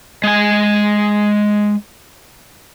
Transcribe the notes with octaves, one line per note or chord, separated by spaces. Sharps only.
G#3 G#5